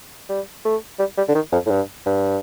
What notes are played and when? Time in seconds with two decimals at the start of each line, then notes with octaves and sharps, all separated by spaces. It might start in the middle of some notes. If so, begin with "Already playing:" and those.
0.30 G3
0.65 A3
0.99 G3
1.18 G3
1.28 D3
1.35 D#3
1.53 F2
1.66 A2
1.70 G2
2.06 G2